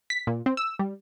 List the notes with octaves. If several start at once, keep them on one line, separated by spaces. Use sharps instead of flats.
B6
A#2
C4
E6
G3